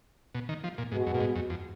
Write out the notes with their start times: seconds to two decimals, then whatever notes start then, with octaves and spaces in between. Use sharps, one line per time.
0.35 B2
0.49 D#3
0.64 F3
0.78 A#2
0.92 G#2 B2 G#3 B3 F#4
1.07 F#2
1.14 A#2
1.21 G#2
1.36 F#2
1.50 F2